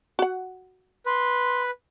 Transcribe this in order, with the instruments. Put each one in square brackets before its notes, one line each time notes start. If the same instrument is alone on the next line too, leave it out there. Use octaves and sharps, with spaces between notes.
[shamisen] F#4 F#5
[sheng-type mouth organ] B4 [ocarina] C6